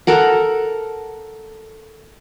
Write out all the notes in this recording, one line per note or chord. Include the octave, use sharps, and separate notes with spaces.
A4 A#4 F#5